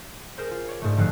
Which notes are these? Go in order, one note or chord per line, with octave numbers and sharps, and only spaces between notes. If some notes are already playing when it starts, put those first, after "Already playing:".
G#4 A#4 C5
F4
C#5 D5
G#2 A3
G1 G2 F3 A4 F#6 C7